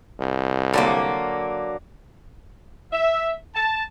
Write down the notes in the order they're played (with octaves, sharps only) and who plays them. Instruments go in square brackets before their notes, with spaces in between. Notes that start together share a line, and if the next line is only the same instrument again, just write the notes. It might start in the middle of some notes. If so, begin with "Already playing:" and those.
[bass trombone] C2
[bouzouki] D3 F#3 A#3
[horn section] E5
A5